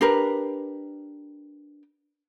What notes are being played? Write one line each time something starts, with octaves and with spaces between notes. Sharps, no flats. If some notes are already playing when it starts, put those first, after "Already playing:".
D4 G4 A#4 B4